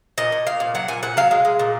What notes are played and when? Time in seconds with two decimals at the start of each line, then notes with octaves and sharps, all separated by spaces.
0.18 A#2 D#5
0.32 A#2
0.47 A#2 F5
0.60 A#2
0.75 F#3 F#5
0.88 A#2 G#5
1.03 A#2 F#5
1.17 F#3 F5
1.31 G#3
1.45 G#3
1.59 A#2